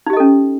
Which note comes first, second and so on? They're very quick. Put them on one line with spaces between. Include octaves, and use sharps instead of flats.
D#4 G4 D#5 A4 C#4